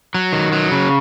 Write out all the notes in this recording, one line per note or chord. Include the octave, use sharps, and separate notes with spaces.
F#3
D#3
F#3
C#3